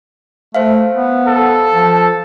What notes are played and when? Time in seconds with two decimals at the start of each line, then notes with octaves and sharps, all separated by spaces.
0.55 A3 C5 E5 F5
0.94 B3
1.28 A4
1.72 F3